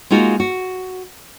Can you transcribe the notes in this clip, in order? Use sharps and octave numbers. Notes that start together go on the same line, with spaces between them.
G#3 A#3 D#4 F4 F#4
F#4